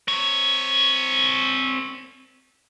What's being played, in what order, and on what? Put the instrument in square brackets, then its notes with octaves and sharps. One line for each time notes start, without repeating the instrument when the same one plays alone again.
[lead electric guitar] C4 C#5